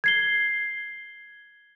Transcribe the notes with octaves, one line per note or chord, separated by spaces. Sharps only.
G#6 C7 G7